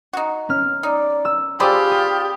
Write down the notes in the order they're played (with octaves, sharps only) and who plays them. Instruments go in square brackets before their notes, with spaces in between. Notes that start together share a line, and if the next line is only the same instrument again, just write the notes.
[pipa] D#4 F#4
[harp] C#4 F6
[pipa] D#4 [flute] D5
[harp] E6
[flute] F4 [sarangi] G4 [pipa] G#4 C5 D5 [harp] B5 D#6 E6
[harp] D#6